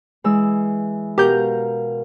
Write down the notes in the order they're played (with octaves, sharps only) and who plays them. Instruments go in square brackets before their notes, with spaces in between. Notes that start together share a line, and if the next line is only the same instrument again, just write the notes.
[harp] E3 G#3 E6
[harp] B2 A#4 F5 [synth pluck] G4 G6